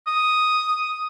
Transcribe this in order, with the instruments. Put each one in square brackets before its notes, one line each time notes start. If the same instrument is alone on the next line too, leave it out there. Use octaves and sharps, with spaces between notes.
[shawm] D#6